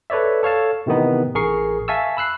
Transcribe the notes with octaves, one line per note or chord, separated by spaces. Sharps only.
A4 B4 C#5 D5 E5
A4 C#5 F5 A5
A2 C3 D#3 E3 B3 D#4
A1 G#4 A#4 C#6 C7
E5 F5 G#5 A5 C#6 E6
B5 E6 F#6 C7